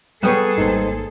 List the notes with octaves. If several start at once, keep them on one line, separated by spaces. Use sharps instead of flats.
G3 B3 G#4 A4 C#5 G5 D#6 F#6
G#1 A#3 D#4 C5